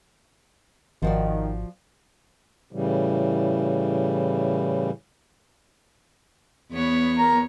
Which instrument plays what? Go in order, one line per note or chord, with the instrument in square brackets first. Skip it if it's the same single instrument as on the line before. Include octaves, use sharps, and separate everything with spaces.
[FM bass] G#1 [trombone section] D#3 [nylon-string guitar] F3 F#4 D5
[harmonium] A2 C#3 E3 G3
[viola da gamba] E2 B3 C#5
[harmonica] A#4 A#5